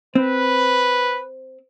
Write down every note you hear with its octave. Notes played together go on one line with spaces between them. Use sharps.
C4 B4